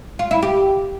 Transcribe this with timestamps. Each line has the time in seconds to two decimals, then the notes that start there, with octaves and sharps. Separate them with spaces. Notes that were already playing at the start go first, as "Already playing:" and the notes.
0.19 F4
0.31 E4
0.43 G4